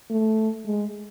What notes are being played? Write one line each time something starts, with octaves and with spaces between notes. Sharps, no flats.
A3
G#3